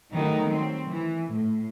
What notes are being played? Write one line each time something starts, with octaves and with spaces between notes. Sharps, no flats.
D#3 F#3 G3 A3 B3 D#4
F#3 G3 C4
E3
A2